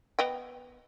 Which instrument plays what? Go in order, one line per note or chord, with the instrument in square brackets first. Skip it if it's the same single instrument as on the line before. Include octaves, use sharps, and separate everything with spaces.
[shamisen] B3 D#5 G5